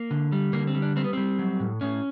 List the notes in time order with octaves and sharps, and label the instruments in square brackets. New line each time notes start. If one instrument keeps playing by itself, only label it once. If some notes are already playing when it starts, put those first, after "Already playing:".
Already playing: [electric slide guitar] A#3
D3
G3
D3 A#3
C4
G3
D4
G3 C4
B3
G3 C4
F#3
A2
A2 C#4